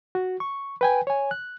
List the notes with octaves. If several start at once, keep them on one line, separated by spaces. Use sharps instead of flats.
F#4
C#6
B4 G5 G#5
C#5 G#5
F#6